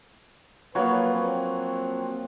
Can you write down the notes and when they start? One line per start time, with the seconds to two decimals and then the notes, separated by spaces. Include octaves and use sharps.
0.75 F3 F#3 A#3 F#4 B4 C#5
1.14 C4